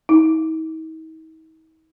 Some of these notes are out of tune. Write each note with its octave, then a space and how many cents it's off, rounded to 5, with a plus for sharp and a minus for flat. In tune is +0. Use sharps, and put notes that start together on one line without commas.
D#4 +45